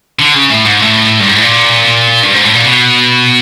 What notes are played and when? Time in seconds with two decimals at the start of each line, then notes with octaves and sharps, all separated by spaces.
0.19 D3
0.35 C#3
0.50 A2
0.65 G#2
0.80 A2
1.20 G2
1.27 G#2
1.35 A2
1.42 A#2
2.23 G2
2.34 G#2
2.44 A2
2.55 A#2
2.65 B2